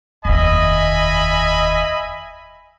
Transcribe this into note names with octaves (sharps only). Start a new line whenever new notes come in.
F1 D#2 D#5 E5 G#5 B5